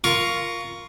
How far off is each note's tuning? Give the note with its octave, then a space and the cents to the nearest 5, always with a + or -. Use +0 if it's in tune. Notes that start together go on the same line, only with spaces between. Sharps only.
F4 +0 A#4 +0 C#6 +15